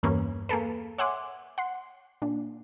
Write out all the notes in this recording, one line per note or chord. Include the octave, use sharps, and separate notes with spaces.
E2 G2 E3 A#3 B3 C#4
A#3 G#4 A4 B4
C#5 E5 F#5 G#5 C6 D6
F#5 C6
A#2 D4